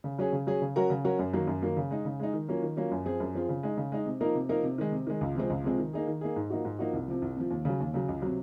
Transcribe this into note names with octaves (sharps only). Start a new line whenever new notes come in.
C#3
F#3 C#4 G#4
C#3
F#3 C#4 G#4
C#3
F#3 C#4 F#4 A#4
C#3
F#3 C#4 F#4 A#4
F#2
D#3 F#3 A#3
F#2
D#3 F#3 A#3
C#3
G#3 D#4
C#3
G#3 D#4
D#3
F#3 A#3 C#4 F4
D#3
F#3 A#3 C#4 F4
F#2
F3 C4 F4 G#4
F#2
F3 C4 F4 G#4
C#3
G#3 D#4
C#3
G#3 D#4
C3
F3 A#3 D#4 A#4
C3
F3 A#3 D#4 A#4
C3
D#3 G#3
C3
D#3 G#3
C#2
C3 F3 G#3 C4
C#2
C3 F3 G#3 C4
D#3
A#3 D#4 G#4
D#3
A#3 D#4 G#4
G#2
F3 A#3 D#4 F#4
G#2
F3 A#3 D#4 F#4
C2
C3 F3
C2
C3 F3
D#2
C#3 F#3
D#2
C#3 F#3
C#2
C3 F#3